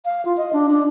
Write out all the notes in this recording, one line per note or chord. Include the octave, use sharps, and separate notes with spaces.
F5
F4
D#5
D4
D4